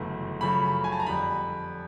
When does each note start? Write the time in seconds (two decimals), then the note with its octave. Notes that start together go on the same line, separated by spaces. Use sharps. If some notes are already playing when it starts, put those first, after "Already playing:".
Already playing: G1 F#2 C#3 E3 A3
0.41 F#2 C#3 F3 A3 B5
0.84 G#5
0.92 A5
1.00 A#5
1.06 F2 D3 G3 B5